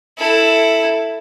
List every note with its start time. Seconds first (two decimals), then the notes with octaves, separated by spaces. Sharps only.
0.18 E4 A4